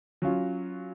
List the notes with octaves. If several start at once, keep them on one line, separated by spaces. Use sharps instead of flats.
F#3 C#4 F4